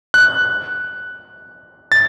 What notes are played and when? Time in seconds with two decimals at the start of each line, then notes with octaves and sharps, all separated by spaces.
0.14 F#6
1.92 A6